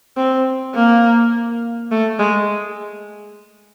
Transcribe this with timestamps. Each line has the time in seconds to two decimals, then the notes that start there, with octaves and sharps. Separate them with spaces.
0.17 C4
0.75 A#3
1.92 A3
2.20 G#3